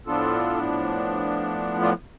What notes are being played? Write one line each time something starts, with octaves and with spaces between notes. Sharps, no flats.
A2 F3 B3 D4 F4 A4
D4 F4